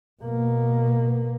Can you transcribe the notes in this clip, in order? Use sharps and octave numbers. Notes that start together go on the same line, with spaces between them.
B2 A#3